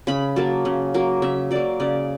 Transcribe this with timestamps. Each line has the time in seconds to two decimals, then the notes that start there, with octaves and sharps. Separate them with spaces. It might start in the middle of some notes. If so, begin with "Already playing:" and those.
0.07 C#3 B5
0.36 F#3 A#3 A5
0.65 C#3
0.94 F#3 A#3
1.22 C#3 E5
1.51 F#3 A#3 D5
1.80 C#3 D5